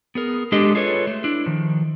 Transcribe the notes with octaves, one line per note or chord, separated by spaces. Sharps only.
B3 G#4 A#4
G#3 D4 G4 A4 D#5
F4 G#4 A4 B4 C#5
A3
D4 E4
D#3 F3